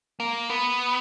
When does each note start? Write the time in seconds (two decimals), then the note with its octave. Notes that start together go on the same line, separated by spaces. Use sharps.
0.20 A#3
0.50 B3